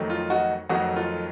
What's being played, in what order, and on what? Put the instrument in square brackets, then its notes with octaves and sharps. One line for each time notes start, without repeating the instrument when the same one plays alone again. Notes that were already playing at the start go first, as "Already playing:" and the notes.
Already playing: [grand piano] F2 D#3 F#3 A3
F4
D#4 F#4
F2 D#3 F#3 A3 D#4 F#4
F4 A4